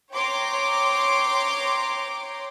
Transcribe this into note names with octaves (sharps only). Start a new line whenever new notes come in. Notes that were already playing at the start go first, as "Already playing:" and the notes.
C#5 G5 A#5 C6 D6